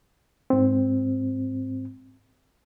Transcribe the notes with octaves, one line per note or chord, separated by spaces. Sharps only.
G#2 C4